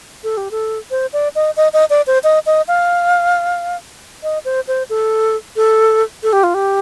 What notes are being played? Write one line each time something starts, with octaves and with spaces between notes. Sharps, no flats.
A4
G4
A4
C5
D5
D#5
D#5
D#5
D5
C5
D#5
D#5
F5
D#5
C5
C5
A4
A4
A4
G4
F4
G4